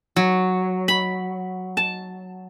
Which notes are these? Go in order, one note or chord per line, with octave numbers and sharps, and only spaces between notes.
F#3
B5
A5